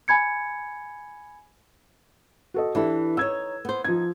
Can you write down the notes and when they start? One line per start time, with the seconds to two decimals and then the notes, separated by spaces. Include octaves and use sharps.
0.08 G#5 B5 G#6 C#7
2.54 F#4 A4 D#5
2.75 E3 D4 E4 G4 A4
3.17 D#4 C#5 E6 G#6
3.65 B3 C5
3.84 F3 D#4 G#6